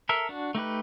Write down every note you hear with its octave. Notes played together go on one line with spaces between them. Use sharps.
A4 A#4 E5
D4 F#4
A3 D#4 G4 B4